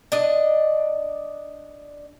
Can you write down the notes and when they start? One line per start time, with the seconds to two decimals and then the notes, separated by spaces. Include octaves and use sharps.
0.12 D4 D#5